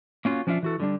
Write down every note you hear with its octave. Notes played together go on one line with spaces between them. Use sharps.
A#3 C#4 F4 F#4
F3 C#4 D4 F4 E5 F5
E3 F#4 A4
D3 G3 D4